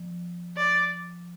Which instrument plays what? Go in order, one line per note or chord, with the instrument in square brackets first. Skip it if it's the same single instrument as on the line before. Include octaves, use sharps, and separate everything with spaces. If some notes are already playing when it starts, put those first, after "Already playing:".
Already playing: [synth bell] F3
[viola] D5